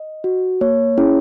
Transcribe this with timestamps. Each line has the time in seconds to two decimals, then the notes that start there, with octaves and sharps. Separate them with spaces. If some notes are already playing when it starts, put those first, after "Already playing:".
Already playing: D#5
0.24 F#4
0.61 A#3 C#5
0.98 C#4 E4 G#4